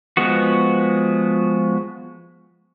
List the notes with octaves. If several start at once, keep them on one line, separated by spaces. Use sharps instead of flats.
F3 G#3 B3 F#4